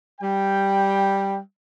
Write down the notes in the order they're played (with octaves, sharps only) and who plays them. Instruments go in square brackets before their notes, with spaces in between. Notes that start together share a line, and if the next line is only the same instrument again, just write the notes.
[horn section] G3 G5